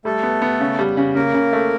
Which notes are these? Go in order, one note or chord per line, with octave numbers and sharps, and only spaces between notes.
G3 A3 A4
B3
B3
C#3
G3
C#3
C#3 A#3 A#4
C#3
A3